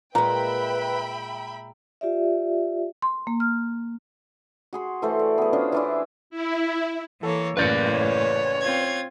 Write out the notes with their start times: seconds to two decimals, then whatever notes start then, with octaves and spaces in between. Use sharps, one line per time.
0.15 A#2 G#3 B4 E5 G5 A#5 B5
2.01 F4 G4 D5 E5
3.02 C6
3.27 A#3
3.40 F6
4.73 F#4 G#4 C6
5.02 E3 A3 A4 C5
5.19 D5
5.38 B3 G#4
5.53 C#4 D4 F4 C5
5.72 E3 D4 E4
6.30 E4
7.23 E3 A#3 A4 C#5
7.57 F#1 A2 E3 A#3 B4 D5 G6 C#7
7.92 C#5
8.61 C4 F4 G#6